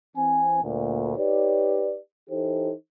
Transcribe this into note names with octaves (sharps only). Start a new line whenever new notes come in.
E3 C4 G#5
D2 A#2
D#4 G4 B4 C#5 D5
E3 D#4 G4 A4 C5